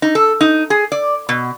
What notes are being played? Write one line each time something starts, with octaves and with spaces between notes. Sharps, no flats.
D#4
A4
D#4
G#4
D5
B2